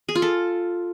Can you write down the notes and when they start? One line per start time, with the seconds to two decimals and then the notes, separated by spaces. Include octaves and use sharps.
0.09 G#4
0.15 F4
0.22 A4